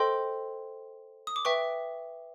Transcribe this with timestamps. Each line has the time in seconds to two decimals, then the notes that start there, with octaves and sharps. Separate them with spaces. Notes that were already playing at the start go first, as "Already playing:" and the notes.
Already playing: A4 C5 D#5 G5 C6
1.27 D#6
1.36 D6
1.45 B4 E5 G5 C#6